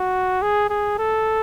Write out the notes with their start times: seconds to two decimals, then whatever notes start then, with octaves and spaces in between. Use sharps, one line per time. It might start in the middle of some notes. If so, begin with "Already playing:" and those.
Already playing: F#4
0.42 G#4
0.70 G#4
0.99 A4